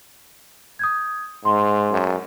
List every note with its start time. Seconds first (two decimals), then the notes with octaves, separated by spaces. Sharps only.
0.79 D#6 G6 G#6
1.45 G#2 C6
1.92 F#2